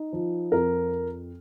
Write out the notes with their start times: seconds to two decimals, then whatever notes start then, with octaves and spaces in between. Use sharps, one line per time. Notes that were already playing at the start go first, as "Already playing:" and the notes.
Already playing: D#4
0.13 F3
0.52 F2 A#4